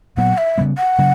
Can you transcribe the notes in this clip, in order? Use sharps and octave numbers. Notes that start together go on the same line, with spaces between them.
A#2 F#3 B3 F#5
E5
C#3 G3 B3
F#5
C#3 F#3